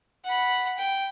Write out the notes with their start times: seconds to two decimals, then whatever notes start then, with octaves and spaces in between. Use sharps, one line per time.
0.25 F#5 B5
0.78 G5